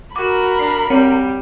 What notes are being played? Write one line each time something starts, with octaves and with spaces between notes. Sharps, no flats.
F#4 A#4 B5 D6
D4 C7
G3 C4 C#5